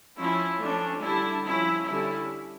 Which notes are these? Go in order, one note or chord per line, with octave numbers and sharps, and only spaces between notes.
F3 C#4 E4
F3 A3 C#4 D4
D3 G3 D4 E4
F3 C#4 E4
D3 G3 C#4 E4